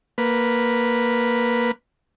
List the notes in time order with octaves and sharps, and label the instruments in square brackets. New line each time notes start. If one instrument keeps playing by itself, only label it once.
[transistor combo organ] A#3 B4